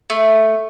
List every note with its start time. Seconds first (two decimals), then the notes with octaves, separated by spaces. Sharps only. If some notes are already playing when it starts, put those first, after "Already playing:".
0.10 A3